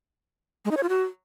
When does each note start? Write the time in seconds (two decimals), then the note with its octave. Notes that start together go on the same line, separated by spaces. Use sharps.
0.65 G#3
0.71 D#4
0.77 C#5
0.83 F4
0.89 F#4